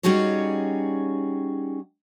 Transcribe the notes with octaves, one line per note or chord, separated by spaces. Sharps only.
G3 C#4 D#4 F#4 G#4 C#5